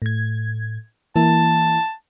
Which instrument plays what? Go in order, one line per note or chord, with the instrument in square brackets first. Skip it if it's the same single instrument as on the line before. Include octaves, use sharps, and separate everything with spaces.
[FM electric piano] A2 G#6
[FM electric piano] E3 A#3 E4 [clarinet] A5